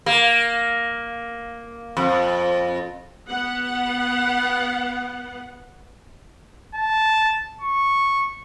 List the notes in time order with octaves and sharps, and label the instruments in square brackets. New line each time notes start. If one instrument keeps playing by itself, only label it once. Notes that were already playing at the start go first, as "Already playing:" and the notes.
[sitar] A#3
F2
[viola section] B3 F#5
[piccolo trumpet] A5
C#6